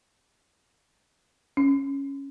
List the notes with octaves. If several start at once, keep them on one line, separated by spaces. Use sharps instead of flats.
C#4